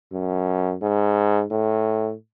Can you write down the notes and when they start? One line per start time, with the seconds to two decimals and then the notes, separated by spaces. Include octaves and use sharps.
0.13 F#2
0.82 G#2
1.51 A2